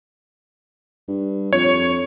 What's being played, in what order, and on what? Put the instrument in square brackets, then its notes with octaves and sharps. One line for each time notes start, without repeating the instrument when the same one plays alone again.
[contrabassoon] G2
[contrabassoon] F2 [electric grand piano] C#5